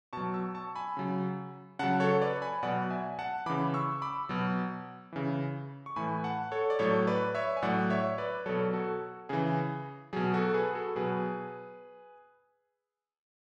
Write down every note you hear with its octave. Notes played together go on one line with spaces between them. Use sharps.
B2 F#3 A5 C#6
C#6 E6
A5 C#6
G#5 B5
C#3 F#3
C#3 F#3 F#5 A5
A4 C#5
B4 D5
G#5 B5
B2 F#3 D5 F#5
E5 G#5
F#5 A5
C#3 E3 B5 D6
C#6 E6
B5 D6
B2 F#3
C#3 E3
C#6
A2 E3 G#5 B5
F#5 A5
A4 C#5
D5
A2 F#3 A4 C#5
B4 D5
C#5 E5
G#5
A2 F#3 D5 F#5
C#5 E5
B4 D5
B2 F#3 A4 C#5
F#4 A4
C#3 E3 G#4
B2 F#3 G#4
F#4 A4
A4
G#4 B4
F#4 A4
B2 F#3 G#4 B4